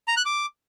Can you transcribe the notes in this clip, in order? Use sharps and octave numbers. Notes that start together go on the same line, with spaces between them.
A#5
F#6
D6